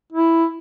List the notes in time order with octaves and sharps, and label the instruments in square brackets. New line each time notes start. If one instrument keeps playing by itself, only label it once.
[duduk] E4